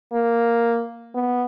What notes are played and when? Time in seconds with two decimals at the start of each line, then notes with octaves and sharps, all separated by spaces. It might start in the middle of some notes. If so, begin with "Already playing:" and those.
0.13 A#3
1.15 B3